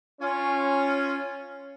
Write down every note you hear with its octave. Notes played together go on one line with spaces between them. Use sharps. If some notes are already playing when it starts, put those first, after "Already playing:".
C#4 F4